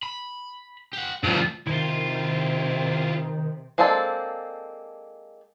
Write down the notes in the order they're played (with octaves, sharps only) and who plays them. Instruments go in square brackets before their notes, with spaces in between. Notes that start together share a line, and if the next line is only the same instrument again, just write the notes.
[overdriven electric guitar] B5
G4 F#5
[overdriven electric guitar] D2 G3 [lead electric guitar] G2 F3
[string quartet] C3 [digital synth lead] D#3 [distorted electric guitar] E4 F4
[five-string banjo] G#3 A#3 C4 D4 A4